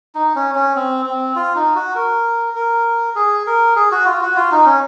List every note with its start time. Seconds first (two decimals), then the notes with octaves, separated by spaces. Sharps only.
0.15 D#4
0.36 C#4
0.55 C#4
0.75 C4
1.06 C4
1.35 F4
1.56 D#4
1.75 F#4
1.95 A#4
2.56 A#4
3.16 G#4
3.47 A#4
3.76 G#4
3.91 F#4
4.06 F4
4.22 F#4
4.36 F4
4.52 D#4
4.66 C#4